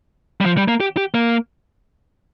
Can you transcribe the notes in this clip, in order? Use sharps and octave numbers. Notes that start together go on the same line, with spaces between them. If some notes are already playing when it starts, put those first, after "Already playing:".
G3
F3
G3
A#3
G4
G4
A#3